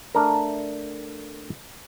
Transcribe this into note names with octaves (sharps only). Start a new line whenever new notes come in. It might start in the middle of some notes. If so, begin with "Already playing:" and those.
A3 D4 A#4